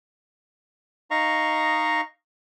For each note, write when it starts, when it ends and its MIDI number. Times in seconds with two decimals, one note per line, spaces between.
1.11 2.01 63
1.11 2.01 75
1.11 2.01 77
1.11 2.01 82
1.11 2.01 85